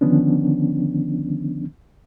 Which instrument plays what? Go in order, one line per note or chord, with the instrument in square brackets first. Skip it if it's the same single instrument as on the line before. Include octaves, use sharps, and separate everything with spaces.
[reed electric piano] D3 D#3 F3 B3 C#4 D4